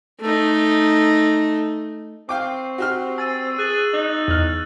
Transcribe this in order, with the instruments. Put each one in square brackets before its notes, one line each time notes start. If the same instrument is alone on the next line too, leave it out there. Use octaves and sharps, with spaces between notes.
[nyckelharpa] A3 D#4
[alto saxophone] C4 [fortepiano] F5 G5 D6 [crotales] C#6
[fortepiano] F#4 G4 F6
[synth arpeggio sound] G#5 [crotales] E6 A6 D#7
[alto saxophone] G#4 [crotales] F#6 A6 F#7
[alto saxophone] D#4
[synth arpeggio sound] E2 F6